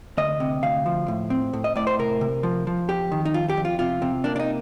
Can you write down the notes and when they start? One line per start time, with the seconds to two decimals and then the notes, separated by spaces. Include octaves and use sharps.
0.17 D2 D#5
0.40 C3
0.63 D2 F5
0.86 F3
1.08 A2
1.30 C4
1.53 A2
1.64 D#5
1.76 A2 D5
1.87 C5
1.99 C3 A#4
2.21 C3
2.43 F3
2.67 F3
2.89 F2 G4
3.12 D#3
3.25 D#4
3.34 F2 F4
3.50 G4
3.57 F2
3.65 F4
3.79 C3 F4
4.02 C3
4.24 A#3 D4
4.36 D4
4.40 D#4